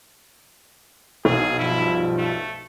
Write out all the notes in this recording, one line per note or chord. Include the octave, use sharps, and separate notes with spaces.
B1 G#4
G2 F3 E4
A3